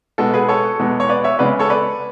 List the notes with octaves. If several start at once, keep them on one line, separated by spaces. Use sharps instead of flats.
B2 G#3 B3 F#4 A4
G#4 B4
A4 C#5
E2 B2 G#3 B3
C#5
B4 D5
C#5 E5
C#3 G#3 B3 B4 D5
A4 C#5
B4 D5